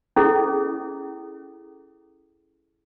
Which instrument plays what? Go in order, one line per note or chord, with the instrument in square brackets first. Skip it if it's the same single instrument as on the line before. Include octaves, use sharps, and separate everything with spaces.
[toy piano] C#4 E4 G#4 A4 D#5